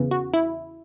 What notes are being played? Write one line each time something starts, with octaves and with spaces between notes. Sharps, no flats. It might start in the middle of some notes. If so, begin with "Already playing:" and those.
Already playing: E2 C#3 E3
F#4
E4